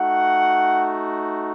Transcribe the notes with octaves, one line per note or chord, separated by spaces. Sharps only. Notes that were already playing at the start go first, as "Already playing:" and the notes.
Already playing: A3 D#4 F#4 F#5